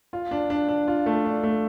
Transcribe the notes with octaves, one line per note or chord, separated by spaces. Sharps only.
F4
D4
D4
D4
F4
A3
D4
A3